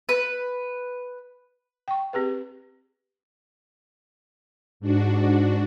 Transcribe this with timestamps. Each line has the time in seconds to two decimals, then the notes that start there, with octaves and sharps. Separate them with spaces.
0.09 B4
1.88 G5 C#6
2.13 C4 G4 G#4 B4
4.80 G#2 D4 F#4